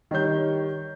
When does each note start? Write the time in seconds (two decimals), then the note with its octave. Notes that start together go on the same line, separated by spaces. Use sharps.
0.11 D#3 G3 C#5 G6